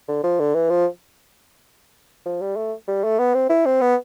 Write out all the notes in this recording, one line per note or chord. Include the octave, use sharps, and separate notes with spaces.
D3
F3
D3
E3
F3
F3
G3
A3
G3
A3
B3
C4
E4
C4
B3